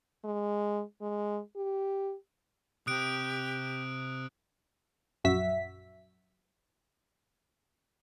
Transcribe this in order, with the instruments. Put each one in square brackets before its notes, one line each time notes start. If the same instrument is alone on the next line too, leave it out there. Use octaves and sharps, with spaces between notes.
[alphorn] G#3
G#3
G4
[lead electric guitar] C3 C4 [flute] G4 [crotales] D#6 F#6 D7
[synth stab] A#1 F#2 F#4 E5 B6